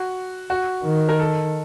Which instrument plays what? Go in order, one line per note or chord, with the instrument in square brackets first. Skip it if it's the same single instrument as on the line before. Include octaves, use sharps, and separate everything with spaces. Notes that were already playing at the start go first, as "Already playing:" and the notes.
Already playing: [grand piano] F#4
F#4
[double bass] D#3
[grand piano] A#4
A4